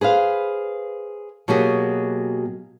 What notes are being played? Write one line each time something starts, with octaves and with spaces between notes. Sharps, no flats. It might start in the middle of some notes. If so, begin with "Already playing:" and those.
G#4 B4 C5 F5
B2 F#3 A#3 G4 G#4